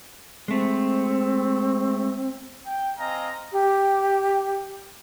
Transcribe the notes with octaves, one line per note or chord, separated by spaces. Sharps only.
G#3 A3 C4
G5
C4 D#5 F5 G#5 A#5
G4